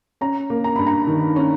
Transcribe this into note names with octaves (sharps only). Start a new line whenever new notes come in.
C#4 A#5
A#3
A#5
G2 B5
A#5
D#3
C#4